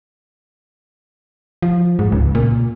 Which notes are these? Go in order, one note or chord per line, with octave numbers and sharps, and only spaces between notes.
F3
G#2
C#2
A#2